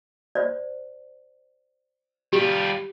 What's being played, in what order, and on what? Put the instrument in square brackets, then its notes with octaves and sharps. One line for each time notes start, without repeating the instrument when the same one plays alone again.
[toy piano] C5 D5
[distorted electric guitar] G3 F4 [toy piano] G4